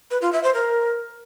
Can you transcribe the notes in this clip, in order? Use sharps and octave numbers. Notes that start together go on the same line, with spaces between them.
B4
F4
E5
C5
A#4